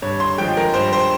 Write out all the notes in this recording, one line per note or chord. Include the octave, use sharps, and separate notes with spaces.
G2 C#5
C6
F3 G#3 G5
A#4
G2 C5
C5